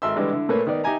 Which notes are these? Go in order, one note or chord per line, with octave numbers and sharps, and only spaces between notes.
G#1 A4 E5 C6 E6
D3 E3 G3 G#3 D4
D3 E4
A#2 A3 A#3 A#4 B4 C#5
D#3 B3 D5
D#4 G4 E5 G#5 A#5